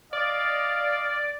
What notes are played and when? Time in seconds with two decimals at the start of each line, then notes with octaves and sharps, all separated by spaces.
0.13 D5 D#5 F5